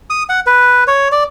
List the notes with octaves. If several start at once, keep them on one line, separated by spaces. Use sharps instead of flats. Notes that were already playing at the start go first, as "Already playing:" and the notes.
D#6
F#5
B4
C#5
D5